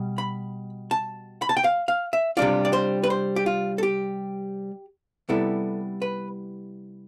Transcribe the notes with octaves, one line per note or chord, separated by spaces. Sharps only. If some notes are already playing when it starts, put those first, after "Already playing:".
Already playing: B2 G3
B5
A5
B5
A5
G5
F5
F5
E5
C3 G3 D4 F4 D5
D5
C5
B4
C5
G4
F4
A4
G4
C3 G3 B3 E4 A4
B4